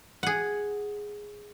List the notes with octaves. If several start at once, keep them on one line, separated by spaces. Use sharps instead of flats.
G#4 F#5